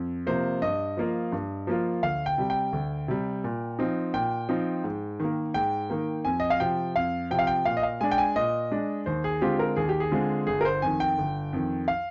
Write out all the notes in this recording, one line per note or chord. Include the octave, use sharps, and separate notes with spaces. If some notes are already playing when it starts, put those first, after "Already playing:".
Already playing: F2
C3 F3 A#3 C5
G2 D#5
F3 A#3 F4
G2
F3 A#3 F4
D2 F5
G5
C3 G3
G5
D2
C3 G3
A#2
F3 C4 D#4
A#2 G5
F3 C4 D#4
G#2
D#3 A#3
G#2 G5
D#3 A#3
F2 G#5
D#5
F5
C3 F3 G5
F2 F5
C3 F3 G5
F5
G5
A#2 F5
D#5
F5
G#3 D4 G#5
G5
G#5
A#2 D#5
G#3 D4
D#2 C5
G#4
D3 G#3 C4 F4 G4
A#4
D#2 G#4
G4
G#4
D3 G#3 C4 F4
G1 G#4
A#4
C5
F2 D#3 G#5
G5
G1
F2 D#3
F5